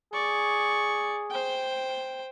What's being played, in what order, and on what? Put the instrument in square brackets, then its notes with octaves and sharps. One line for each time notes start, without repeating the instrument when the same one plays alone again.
[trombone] G#4 [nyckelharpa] D5 C#6
[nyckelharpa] C5 G5